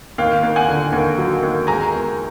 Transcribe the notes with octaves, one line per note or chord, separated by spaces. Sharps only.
D#2 F5 G5
D#2
F#5 G#5
D3
D#2
F#3
D#2
G#3 G#5 A#5
E2